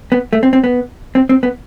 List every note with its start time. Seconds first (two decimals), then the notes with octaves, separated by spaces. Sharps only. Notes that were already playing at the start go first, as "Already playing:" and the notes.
0.12 B3
0.33 A3
0.43 C4
0.53 C4
0.64 B3
1.15 C4
1.29 C4
1.43 B3